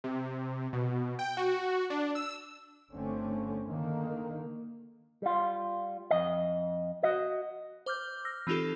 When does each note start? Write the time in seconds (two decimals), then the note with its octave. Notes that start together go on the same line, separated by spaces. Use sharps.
0.04 C3
0.73 B2
1.19 G5
1.37 F#4
1.90 D4
2.15 E6
2.92 G1 D3 A3 C4 C#4
3.68 D3 D#3 A#3
5.22 G3 F4
6.11 F2 D#5
7.03 F#4 D#5
7.86 C5 D6 F6 G6
8.25 E6 F6 A#6
8.47 E3 C4 D#4 F4 G4 A4